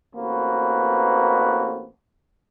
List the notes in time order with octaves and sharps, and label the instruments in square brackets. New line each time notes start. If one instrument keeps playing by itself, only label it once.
[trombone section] A1 A#3 C4 F#4 B4